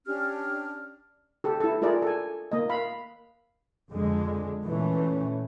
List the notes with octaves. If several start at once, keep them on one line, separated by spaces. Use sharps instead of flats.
C#4 D4 G4 F6
G4 A4
E4 A4
E4 F4 G#4 A#4 D5
A4 G#5
A#3 D#5
F5 B5
F2 D3 G#3
A#2 E3 A3 C#4